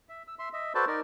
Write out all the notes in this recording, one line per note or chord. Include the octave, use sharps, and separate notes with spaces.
E5
E6
E5 C6
D#5 E5
F#4 A4 B4 C5 D5 A5
D#4 A#4 D5